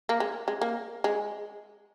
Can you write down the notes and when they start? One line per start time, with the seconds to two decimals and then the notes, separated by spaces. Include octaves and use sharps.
0.09 A#3
0.20 G#3
0.48 G#3
0.62 A#3
1.04 G#3